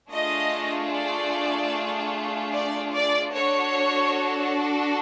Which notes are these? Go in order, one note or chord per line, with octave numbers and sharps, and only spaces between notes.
A3 D4 F4 G#4 D#5
D5
D5
D5
D4 F#4 A4 C#5